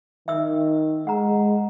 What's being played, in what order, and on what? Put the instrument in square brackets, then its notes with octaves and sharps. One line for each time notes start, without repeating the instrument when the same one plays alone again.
[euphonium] D#3 [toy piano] E5 E6
[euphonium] G#3 [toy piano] F#5 A#5